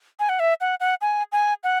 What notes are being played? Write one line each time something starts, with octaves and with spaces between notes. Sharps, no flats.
G#5
F#5
E5
F#5
F#5
G#5
G#5
F#5